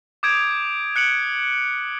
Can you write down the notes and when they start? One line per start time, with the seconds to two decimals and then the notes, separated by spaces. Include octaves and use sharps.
0.23 D6 D#6 G6 G#6 D7
0.96 F#6 C#7 D7 F#7